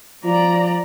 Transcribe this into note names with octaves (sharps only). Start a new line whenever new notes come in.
F3 D5 A#5